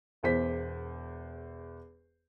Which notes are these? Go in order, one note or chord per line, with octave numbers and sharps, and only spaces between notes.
E1 E2 C5 B6